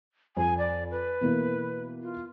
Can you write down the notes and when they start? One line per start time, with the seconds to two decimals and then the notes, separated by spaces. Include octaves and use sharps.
0.37 F2 G#5
0.58 D5
0.91 B4
1.21 B2 E3 A#3
2.02 F4